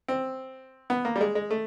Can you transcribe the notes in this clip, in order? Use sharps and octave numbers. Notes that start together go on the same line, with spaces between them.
C4
B3
A#3
G3
G#3
G#3
A3